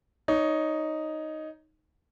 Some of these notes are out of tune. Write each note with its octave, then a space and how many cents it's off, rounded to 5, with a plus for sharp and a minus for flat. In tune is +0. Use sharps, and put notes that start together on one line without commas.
D#4 +0 C#5 +15